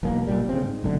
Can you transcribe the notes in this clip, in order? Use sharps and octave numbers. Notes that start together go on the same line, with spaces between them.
E1 B1 B2 A#3
B1 A#2 G3
C#3 C4
G#2
F#1 B1 D3